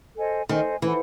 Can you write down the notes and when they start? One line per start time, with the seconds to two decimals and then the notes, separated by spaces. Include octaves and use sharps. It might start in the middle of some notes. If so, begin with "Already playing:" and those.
0.17 A4 C5 D#5 G#5
0.49 D#3 A4 C5 D#5 G#5
0.82 E3 E4 A4 C5 F#5